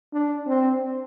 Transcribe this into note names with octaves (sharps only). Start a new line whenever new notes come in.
D4
C4